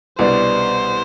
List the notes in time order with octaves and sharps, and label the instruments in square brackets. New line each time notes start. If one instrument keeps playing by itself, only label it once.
[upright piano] C2 B2 G3 B3 D4 [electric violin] C5